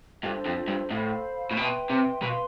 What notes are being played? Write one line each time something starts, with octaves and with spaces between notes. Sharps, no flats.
G2 D4 F4 A4 C5
F2
G2
A2 A4 C5 F5 B5
A2
B2 B4 E5 G5 C6
C3
B2 B4 F5 C6